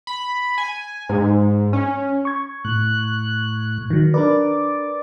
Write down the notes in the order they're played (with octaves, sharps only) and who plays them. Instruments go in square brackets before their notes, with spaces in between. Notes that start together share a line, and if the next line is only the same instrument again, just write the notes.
[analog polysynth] B5
G#5
G#2
C#4
[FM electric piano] C#6 G#6
[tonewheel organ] A2 F#6
[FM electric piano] D#3 F#3
[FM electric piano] D4 A#4 B4 [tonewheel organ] D5